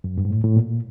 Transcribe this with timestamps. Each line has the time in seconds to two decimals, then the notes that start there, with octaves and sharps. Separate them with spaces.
0.04 F#2
0.17 G2
0.25 G#2
0.30 A2
0.44 A2
0.57 A#2